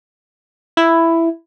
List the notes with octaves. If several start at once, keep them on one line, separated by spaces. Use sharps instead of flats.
E4